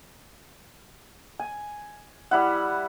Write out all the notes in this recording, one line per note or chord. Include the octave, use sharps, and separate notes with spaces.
G#5
G3 E4 F#5